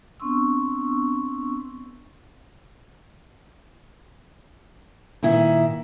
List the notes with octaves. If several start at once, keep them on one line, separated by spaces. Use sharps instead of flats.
B3 C4 D4 C6 C#6 E6
A#2 D#3 E4